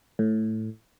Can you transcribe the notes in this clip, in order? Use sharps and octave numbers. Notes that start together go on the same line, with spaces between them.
A2